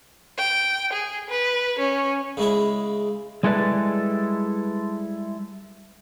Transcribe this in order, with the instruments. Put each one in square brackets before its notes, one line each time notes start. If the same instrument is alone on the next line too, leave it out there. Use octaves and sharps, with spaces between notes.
[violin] G5
G#4
B4
C#4
[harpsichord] C#3 G#3 E4
[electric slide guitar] G3 G#3 E4 A4 B4 D5